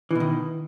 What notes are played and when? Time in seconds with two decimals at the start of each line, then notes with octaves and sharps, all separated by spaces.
0.11 E3
0.15 B2
0.20 D#3